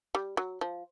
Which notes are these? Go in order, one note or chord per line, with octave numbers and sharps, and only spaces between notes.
G3
F#3
F3